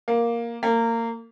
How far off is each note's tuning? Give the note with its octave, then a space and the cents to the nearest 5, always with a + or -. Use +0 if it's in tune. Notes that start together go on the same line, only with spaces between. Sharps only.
A#3 +5
A#3 -25